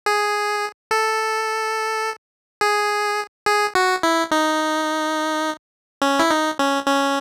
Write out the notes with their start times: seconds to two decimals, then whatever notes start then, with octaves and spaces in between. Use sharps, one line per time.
0.06 G#4
0.91 A4
2.61 G#4
3.46 G#4
3.75 F#4
4.03 E4
4.31 D#4
6.02 C#4
6.20 E4
6.31 D#4
6.59 C#4
6.87 C#4